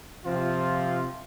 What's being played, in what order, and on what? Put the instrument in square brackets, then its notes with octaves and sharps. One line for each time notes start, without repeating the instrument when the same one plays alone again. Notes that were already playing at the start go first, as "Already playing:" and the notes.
[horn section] C3 F3 C4 F4